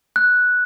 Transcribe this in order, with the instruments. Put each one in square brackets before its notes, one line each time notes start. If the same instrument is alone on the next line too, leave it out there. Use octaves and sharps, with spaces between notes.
[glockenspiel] F#6